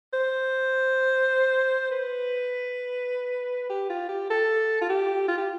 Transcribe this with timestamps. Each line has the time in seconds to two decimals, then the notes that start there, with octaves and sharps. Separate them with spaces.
0.13 C5
1.91 B4
3.70 G4
3.90 F4
4.09 G4
4.30 A4
4.81 F4
4.90 G4
5.28 F4
5.38 G4